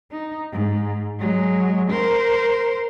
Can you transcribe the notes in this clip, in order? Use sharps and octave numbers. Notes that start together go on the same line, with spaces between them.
D#4
G#2
F#3 G#3
A#4 C5